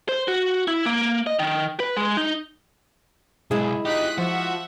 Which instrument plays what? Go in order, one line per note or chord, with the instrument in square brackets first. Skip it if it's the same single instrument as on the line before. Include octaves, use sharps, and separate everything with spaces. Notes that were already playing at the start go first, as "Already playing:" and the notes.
[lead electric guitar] C5
F#4
E4
A#3
D#5
D#3
B4
G#3
D#4
[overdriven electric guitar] B1 [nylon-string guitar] G#3 E4 [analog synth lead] G#4
[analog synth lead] D#4 [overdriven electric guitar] F4 G4 [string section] D#6 F#6 B6
[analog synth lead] F3 [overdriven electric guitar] F#4 [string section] E5 F#5